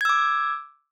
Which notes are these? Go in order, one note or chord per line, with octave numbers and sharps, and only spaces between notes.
D6 E6 G#6